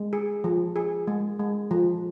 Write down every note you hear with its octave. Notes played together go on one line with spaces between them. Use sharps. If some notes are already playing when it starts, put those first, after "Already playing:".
Already playing: G#3
G#4
F3
G#4
G#3
G#3
F3